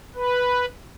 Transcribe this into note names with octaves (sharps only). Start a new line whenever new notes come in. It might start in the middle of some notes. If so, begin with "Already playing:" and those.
B4